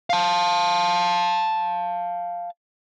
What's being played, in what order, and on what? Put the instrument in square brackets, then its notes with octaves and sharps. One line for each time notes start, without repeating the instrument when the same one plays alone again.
[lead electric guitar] F5 A5